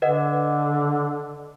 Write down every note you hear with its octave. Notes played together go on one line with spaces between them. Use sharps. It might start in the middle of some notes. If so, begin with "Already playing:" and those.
D3 B4 D#5 F#5